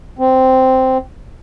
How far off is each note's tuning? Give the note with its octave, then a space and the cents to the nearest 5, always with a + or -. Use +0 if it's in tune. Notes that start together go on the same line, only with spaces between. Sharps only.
C4 -5